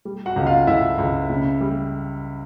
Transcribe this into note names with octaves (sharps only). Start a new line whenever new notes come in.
G3
F#4 F#5
C#2
F4 F5
C#2 E4 E5
C#2
C#3
G3